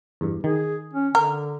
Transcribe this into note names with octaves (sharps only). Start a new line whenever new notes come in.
E2 G2
D#3 G#4
C#4
D3 A#4